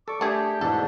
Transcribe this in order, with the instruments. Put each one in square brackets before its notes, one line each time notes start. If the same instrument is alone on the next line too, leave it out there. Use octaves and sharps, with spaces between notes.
[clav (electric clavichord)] A4 D5 [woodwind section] C#6 D6
[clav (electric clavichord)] A3 A5 [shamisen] D4 G#4 [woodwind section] G4
[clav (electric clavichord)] E2 [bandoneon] G#2 B2 D4 [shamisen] A4